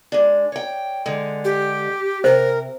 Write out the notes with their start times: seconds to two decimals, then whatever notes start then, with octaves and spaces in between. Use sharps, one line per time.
0.12 G#3 D4
0.52 C#5 G5
1.06 D3 G#3
1.45 G4
2.24 C3 A#4 C5